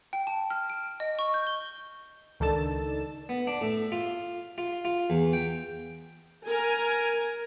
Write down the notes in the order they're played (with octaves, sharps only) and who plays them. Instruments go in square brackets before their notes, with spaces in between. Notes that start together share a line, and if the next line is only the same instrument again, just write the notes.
[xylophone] G5
A5
F6
D7
D#5
C#6
G6
G7
[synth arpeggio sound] C#2 D#3 D4 A4 A6 E7
[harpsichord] B3
D4
A2
F4
F4
F4
E2
G5
[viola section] A#4 G#5